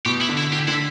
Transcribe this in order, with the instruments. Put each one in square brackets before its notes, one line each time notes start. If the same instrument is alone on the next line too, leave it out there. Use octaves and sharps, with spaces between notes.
[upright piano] B2 [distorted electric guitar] G4
[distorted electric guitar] E4
[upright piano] D3
[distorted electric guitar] E4
[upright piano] D3 [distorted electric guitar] G4
[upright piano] D3 [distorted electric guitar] E4